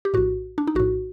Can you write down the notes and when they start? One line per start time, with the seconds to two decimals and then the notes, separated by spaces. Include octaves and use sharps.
0.05 G4
0.14 A#1 A2 F#4
0.58 D4
0.67 D#4
0.75 A#1 A2 F#4